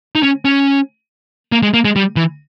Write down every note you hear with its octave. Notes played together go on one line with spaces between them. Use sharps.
D#4
C#4
C#4
A#3
G#3
A#3
G#3
G3
E3